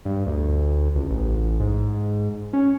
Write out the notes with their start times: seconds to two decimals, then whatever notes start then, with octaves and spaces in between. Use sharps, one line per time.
0.05 G2
0.27 D2
0.95 C#2
1.10 A1
1.60 G#2
2.53 C#4